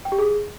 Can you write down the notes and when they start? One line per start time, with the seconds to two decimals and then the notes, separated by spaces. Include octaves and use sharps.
0.05 G5
0.12 G4
0.19 G#4